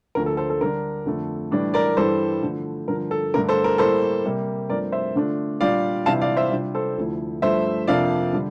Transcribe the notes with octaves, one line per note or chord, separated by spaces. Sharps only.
D2 D3 F3 A#4
A4
A4 C5
A4
D3 G3 D4 A#4
F2 D3 A3
A2 E3 G3 D4
A#4 D5
G2 E3 G3 A4 C5
D3 F3 A3 E4
G2 D3 F3 A#4
A4
G2 D3 A3 D4 A#4
A4 C5
A#4
A2 G3 A#3 A4 C5
C3 G3 A#3
G2 F3 A3 C4 A#4 D5
C5 E5
D3 A3 D4 F4
A#2 G3 D4 F4 D5 F5
C3 E3 G3 D4 F4 F5 A5
D5 F5
C5 E5
C3 G3 D4 F4
A4 C5
D2 D3 F3 A3 E4
G2 F3 A3 C5 E5
F2 C3 F3 A#3 D4 D5 F5
D3 G3